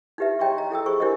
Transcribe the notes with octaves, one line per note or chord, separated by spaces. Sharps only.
D#4 E4 G4 B4 E5
C#5 D#5 G5 A#5 C6 C#6
A#5
E4 A4 G5 E6
G#4 C5 B5 C#6
D4 E4 G4 A#4 C5 D#5